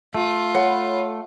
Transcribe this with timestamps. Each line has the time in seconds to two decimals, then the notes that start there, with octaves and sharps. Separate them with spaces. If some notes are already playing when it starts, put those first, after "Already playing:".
0.14 A3 F4
0.55 A4 C#5 F#5 B5